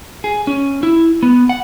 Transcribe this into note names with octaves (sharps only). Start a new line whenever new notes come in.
G#4
C#4
E4
B3
F#5